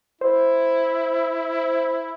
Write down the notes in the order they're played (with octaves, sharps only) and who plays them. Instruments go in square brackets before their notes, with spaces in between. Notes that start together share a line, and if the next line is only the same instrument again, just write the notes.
[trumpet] E4 [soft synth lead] C5